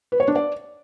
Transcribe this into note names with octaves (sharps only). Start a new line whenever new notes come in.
B4
C#5
D4
D5